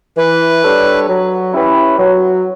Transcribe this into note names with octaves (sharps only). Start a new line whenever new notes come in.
E3 B4
G3 D4 A4 C#5
F#3
C#4 E4 G4 B4
F#3